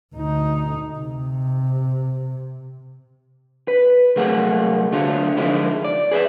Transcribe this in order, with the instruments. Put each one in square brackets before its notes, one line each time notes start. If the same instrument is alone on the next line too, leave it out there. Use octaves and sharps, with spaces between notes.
[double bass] D2 D#4
C3
[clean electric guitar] B4
C2 F#3 A3 A#3 G#4 F#5
D3 F#3 A3 D4 F4
D3 D#3 F3 G#3 E4
D5
G#4 B4 D#5 E5